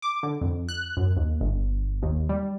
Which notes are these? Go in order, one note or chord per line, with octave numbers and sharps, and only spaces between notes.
D6
D3
F2
F#6
F#2
D#2
G1
D#2
G3